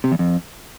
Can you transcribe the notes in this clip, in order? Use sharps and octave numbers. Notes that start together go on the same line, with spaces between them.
C3
E2
F2